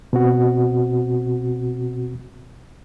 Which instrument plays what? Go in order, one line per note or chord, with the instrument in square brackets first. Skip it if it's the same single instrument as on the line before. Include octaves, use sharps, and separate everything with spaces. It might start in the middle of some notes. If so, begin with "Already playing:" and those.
[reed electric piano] B2 C4 F#4